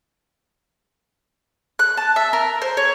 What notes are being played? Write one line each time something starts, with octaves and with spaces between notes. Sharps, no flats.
F#6
A5
E5
A#4
C5
C#5